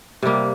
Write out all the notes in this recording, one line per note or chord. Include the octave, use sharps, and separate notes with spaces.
C3 G3 A#3